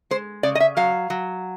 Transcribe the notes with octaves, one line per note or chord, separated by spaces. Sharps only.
G#3 C5
C#3 D5
D#5
E5
F#3 F5
F#3